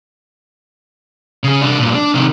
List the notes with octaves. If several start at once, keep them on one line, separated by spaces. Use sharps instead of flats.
C#3 G#4
C2 D4
G2 A#2
D4
C3 D#3